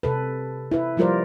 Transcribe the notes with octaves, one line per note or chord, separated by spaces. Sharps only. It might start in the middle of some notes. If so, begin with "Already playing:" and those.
C3 A4 B4
E4 B4
F3 G3 F4 A#4 C5 D5